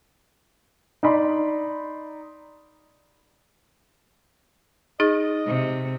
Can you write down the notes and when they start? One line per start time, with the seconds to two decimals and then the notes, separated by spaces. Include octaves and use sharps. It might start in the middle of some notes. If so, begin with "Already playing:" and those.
1.03 D#4 D5 B5 C6
5.00 D#4 G#4 D#5 A6
5.47 C3